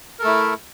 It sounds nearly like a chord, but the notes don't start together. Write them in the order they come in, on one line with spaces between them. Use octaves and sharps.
A#4 A4 A3 E4